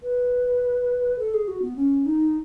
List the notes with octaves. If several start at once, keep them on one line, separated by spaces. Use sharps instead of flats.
B4
A4
G#4
F#4
B3
C#4
D#4